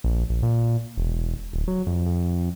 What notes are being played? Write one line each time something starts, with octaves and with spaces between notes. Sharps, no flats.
A#1
A#1
A#2
E1
D1
F#3
F2
F2